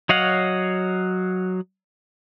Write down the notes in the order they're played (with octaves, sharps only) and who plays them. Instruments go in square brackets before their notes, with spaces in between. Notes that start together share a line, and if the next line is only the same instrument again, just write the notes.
[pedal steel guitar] F#3 C#5 D#5 F5 F#5